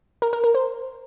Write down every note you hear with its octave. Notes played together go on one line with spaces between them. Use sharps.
A#4
A#4
A#4
C5